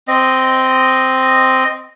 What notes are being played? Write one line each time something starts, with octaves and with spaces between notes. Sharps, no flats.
C4 D#5